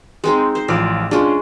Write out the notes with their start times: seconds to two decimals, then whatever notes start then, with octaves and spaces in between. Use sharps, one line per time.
0.24 G#3 C4 D#4
0.55 C5
0.68 A1 F3 D5 D7
1.11 G#3 C#4 D4 F4